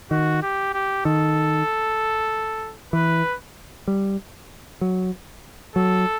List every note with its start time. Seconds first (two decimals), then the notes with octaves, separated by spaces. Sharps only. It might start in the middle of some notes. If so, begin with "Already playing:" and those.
0.11 D#3 F#4
0.42 G4
0.74 G4
1.05 D#3 A4
2.93 E3 B4
3.88 G3
4.81 F#3
5.75 F#3 A4